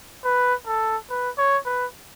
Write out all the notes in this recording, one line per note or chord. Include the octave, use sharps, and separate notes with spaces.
B4
A4
B4
C#5
B4